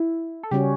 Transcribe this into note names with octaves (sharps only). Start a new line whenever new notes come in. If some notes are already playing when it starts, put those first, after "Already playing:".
Already playing: E4
A4
C#3 G3 C#4 F#4 G4